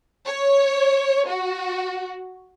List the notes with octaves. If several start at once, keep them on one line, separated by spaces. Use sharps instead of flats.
C#5
F#4